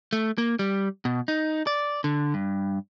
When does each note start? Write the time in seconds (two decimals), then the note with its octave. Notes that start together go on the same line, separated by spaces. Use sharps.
0.13 A3
0.38 A#3
0.59 G3
1.05 B2
1.28 D#4
1.67 D5
2.04 D3
2.34 G2